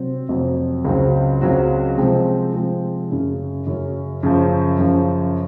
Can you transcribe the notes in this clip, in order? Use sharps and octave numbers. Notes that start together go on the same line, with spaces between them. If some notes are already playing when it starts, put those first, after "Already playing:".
Already playing: C3 F#3 C4
F2 C3 F#3 C4
C#2 C#3 F#3 C4 F#4
C#2 C#3 F#3 C4 F#4
C3 F3 G#3 C4
C3 F3 G#3 C4
F#2 C#3 F#3 C#4
F#2 C#3 F#3 C#4
F#2 C#3 F3
F#2 C#3 F3